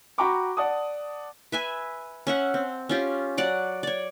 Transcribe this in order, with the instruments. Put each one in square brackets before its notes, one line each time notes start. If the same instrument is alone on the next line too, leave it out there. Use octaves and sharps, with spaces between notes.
[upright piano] F#4 G5 A#5 B5 C#6 D6
D5 F#5 A5 D#6
[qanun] B4 E5 G#5
C#4 E5 F#5
C4
C#4 F4 G4
F#3 D5 F#5
C#5 D5